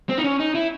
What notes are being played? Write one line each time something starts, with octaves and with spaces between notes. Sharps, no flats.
C4
D#4
C#4
D#4
E4